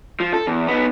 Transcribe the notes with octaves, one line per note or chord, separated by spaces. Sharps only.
F3
A4
E2
B3 D#4